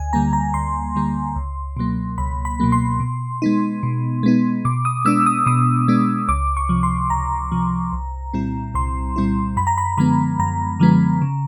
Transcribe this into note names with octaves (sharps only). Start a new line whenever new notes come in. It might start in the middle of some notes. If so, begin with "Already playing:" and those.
Already playing: D2 G#5
D3 G3 A#3 A#5
A#5
D2 C6
D3 G3 A#3
C#2
B2 F#3 A#3
C#2 B5
B5
B2 F#3 A#3
C6
B2
G#3 B3 D#4
B2
G#3 B3 D#4
B2 D6
D#6
G#3 B3 D4 E6
D#6
B2 D#6
G#3 B3 D4
C#2 D6
C#6
C3 F3
C6
C#2 A#5
C3 F3
C2
A#2 G3 C4 E4
C2 C6
A#2 G3 C4 E4
F#2 B5
A#5
B5
D3 F3 G#3 B3 B5
F#2 A#5
D3 F3 G#3 B3
C#3